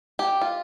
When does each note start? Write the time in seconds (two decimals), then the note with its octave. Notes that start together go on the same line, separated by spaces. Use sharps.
0.19 G4
0.41 F4